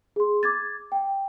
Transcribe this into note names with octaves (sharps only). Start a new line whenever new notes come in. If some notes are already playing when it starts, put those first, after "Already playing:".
G#4 C6
D6 G#6 A6
G5